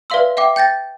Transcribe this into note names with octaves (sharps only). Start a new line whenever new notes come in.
B4 D5 E5 F5 C6 E6
E5 F#5 G5 D6
G5 G6 A6 A#6